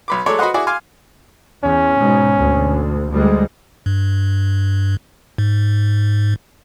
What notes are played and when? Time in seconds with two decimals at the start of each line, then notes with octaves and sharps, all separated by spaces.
0.08 B1 B4 D6
0.26 F#3 G#3 A3 A4 C#5 D5
0.39 F#4 B4 C5 D#5 F#5
0.54 E4 F#4 G#4 D5
0.67 F5 G#5 C6 D6 F6
1.64 E2 C#4
1.98 G#2 B2
2.37 D2
3.11 D2 G3 G#3
3.86 G2
5.38 G#2